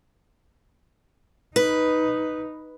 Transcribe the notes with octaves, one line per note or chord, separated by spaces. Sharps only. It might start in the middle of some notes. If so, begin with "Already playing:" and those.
D#4 B4